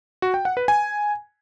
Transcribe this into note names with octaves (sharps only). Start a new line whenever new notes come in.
F#4
G5
F#5
B4
G#5